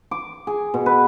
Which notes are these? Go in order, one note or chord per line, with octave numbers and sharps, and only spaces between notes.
D6
G#4
B2
B4